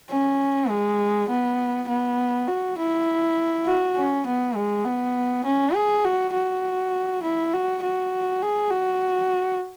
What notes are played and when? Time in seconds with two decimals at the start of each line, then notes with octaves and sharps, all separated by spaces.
0.10 C#4
0.69 G#3
1.29 B3
1.88 B3
2.48 F#4
2.78 E4
3.66 F#4
3.96 C#4
4.26 B3
4.55 G#3
4.85 B3
5.45 C#4
5.74 G#4
6.05 F#4
6.34 F#4
7.23 E4
7.53 F#4
7.83 F#4
8.42 G#4
8.71 F#4